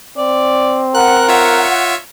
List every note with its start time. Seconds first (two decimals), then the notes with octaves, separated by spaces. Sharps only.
0.17 C4 D5
0.95 A#4 F#5 F#6
1.28 F4 C#5 E5